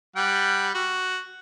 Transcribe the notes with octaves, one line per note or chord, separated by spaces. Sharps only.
G3 F#5 G5
F#4